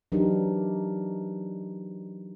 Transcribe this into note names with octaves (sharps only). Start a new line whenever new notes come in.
E3 F#3 D4 D#4 G4 A#4